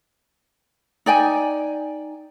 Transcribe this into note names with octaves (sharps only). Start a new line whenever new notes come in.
D#4 D5 G5 G#5